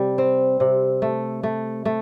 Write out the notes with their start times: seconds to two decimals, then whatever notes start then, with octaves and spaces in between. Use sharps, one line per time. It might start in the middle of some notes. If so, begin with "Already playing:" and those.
Already playing: C3 G3
0.18 C4
0.60 C3
1.02 A3
1.43 A3
1.85 A3